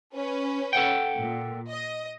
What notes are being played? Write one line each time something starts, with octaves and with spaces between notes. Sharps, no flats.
C#4 B4
A4 F#5 G5
A#2
D#5